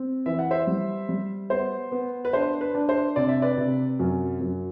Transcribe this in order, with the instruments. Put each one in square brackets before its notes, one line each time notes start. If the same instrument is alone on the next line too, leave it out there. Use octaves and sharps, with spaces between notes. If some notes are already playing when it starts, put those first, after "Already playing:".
Already playing: [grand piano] C4
[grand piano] E3 [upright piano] E5
[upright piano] F#5
C5 E5
[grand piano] G3
G3
[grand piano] B3 [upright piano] C5
[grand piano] B3
[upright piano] B4
[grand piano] D4 [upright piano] C5
[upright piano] B4
[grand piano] D4
[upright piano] C5
[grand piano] C3 [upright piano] D5
[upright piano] E5
B4 D5
[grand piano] C3
F#2
F#2